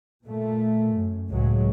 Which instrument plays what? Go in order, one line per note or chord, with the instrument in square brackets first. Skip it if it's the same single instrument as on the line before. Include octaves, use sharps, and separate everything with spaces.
[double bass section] A#2 A3
F#2
C#2 A2 F#3 G#3